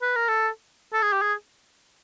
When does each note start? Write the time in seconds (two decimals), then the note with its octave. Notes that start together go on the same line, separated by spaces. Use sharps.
0.02 B4
0.16 A#4
0.29 A4
0.93 A4
1.02 G#4
1.12 G4
1.22 G#4